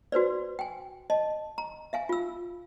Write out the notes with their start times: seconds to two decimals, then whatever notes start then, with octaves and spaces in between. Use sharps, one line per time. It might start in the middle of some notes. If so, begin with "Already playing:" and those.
0.12 F#4 B4 C5 D5
0.59 G5 G#5
1.10 D#5 A5
1.58 A#5
1.93 E5 F5 G#5
2.09 F4 E6